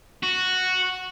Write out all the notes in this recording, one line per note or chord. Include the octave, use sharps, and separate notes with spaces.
F#4